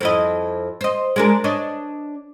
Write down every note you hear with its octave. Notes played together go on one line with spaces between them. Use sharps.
F2 E4 D#5
C5 D#5
G#3 D4 A#4
D4 C#5 D#5